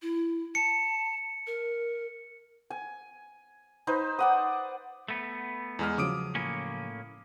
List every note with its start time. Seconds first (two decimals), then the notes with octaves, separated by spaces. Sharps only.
0.02 E4
0.55 A5 C#7
1.47 A#4
2.70 G#5
3.87 D#4 B4 C5
4.19 D5 F#5 D#6
5.08 A3 B3
5.79 E2 G#3 F6
5.98 C#3 F3 F#3 D6 D#6 D7
6.35 A2 A#3 C#4